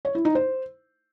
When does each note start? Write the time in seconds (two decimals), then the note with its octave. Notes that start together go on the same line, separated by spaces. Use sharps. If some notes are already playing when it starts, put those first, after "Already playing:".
0.05 C#5
0.15 E4
0.25 D#4
0.35 C5